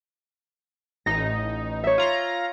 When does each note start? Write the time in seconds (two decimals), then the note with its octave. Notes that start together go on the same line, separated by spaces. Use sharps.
1.06 A1 D#4 A#6
1.84 C#5 E5
1.98 F4 A#5